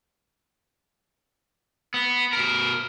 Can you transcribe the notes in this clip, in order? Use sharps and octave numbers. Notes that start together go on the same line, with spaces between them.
B3
B2 A#4